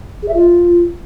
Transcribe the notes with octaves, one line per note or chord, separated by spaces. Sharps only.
G#4
E5
F4